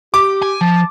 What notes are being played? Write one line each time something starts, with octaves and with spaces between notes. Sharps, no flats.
G4 D6
G#5
F3 A5